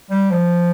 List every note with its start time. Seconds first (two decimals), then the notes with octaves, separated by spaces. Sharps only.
0.10 G3
0.30 F3